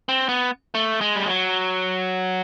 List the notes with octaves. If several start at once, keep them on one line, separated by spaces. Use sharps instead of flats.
C4
B3
A3
G#3
G3
F#3